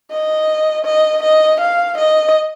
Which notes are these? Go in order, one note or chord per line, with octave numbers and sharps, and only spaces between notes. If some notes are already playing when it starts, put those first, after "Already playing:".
D#5
D#5
D#5
F5
D#5